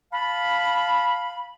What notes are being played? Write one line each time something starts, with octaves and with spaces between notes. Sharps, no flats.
F5 A5 B5